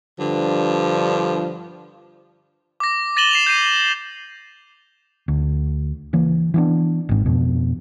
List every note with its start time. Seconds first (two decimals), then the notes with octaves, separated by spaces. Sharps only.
0.19 G2 D3 F3
2.80 D6 A#6
3.17 A6 A#6 D#7 E7 F#7 G7
3.31 C7 E7 F7
3.47 G6 C7 D#7
5.28 D2
6.13 C#3 E3 A#3
6.54 E3 B3 D4
7.09 G#1 G#2
7.26 F2 B2